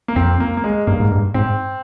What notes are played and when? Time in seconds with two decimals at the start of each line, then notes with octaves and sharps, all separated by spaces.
0.08 A#3
0.16 F2 C4
0.40 A#3
0.57 A#3
0.64 G#3
0.87 G2 A#3
1.00 G#2
1.11 G2
1.34 G#2 C4